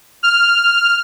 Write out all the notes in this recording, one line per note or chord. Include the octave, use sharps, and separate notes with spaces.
F6